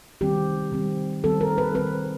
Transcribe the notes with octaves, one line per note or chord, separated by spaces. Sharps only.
D#3 G3 C4 G4
D#3 G3 C4
D#3 G3 C4 A4
A#4
B4
D#3 G3 C4 B4